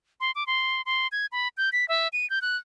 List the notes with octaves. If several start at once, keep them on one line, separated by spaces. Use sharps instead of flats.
C6
D6
C6
C6
G#6
B5
G6
B6
E5
D#7
G6
F#6